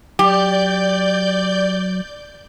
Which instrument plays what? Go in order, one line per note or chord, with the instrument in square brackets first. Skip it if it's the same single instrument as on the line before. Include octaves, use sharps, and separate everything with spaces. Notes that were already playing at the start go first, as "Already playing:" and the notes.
[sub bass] F#3 [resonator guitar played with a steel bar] G4 [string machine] D5 G6